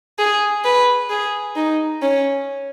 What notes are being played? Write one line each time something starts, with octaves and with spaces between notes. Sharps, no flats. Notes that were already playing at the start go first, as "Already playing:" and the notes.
G#4
B4
G#4
D#4
C#4